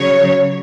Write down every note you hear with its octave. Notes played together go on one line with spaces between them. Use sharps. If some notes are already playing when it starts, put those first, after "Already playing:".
Already playing: C#3 F#3 C#5